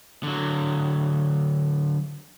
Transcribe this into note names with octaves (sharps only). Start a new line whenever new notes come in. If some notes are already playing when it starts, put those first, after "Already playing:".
D3 F#3